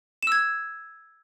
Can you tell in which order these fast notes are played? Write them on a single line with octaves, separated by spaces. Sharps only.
E7 E6 G#6